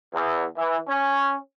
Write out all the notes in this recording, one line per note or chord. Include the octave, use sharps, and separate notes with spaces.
E2
E3
C#4